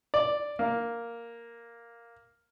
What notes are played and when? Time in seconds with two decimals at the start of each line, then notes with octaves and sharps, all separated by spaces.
0.14 D5
0.59 A#3